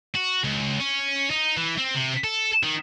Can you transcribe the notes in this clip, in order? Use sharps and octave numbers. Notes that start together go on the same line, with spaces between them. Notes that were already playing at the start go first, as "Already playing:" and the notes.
F#4
C#2
C#4
D#4
E3
C4
C3
A4
D#3